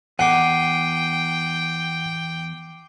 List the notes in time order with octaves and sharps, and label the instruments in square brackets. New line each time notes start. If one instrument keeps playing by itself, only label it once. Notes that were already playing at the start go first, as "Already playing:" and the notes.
[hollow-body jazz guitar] E2 [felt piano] F#5 [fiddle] G5 [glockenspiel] D6 C7 D#7